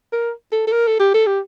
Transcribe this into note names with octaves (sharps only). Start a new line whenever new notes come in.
A#4
A4
A4
A#4
A4
G4
A4
G4